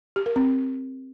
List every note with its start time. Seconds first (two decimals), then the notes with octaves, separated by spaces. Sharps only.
0.16 G4
0.26 A#4
0.36 C4